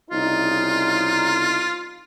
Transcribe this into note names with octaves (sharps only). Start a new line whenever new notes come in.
C2 C#3 D#4 F4